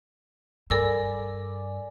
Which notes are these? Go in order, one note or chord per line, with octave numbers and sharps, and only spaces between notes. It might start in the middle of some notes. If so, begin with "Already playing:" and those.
G2 A4 A#4 D5 G#5 B5 E6